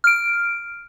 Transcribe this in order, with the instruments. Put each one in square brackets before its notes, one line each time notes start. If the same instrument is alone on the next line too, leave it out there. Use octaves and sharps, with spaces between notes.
[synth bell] F6 D7